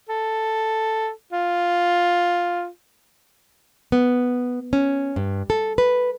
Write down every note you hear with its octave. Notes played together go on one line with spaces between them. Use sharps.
A4
F4
B3
C#4
G2
A4
B4